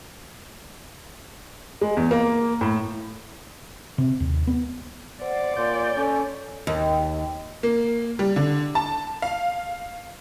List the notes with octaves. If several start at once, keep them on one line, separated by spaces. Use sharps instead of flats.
G#3
E2
A#3
A2
C3
D#2
B3
C5 D5 F#5
A#2 C#5 C6 D6 G6
C#4 A4
D#2
A#3
G3
D3
A5
F5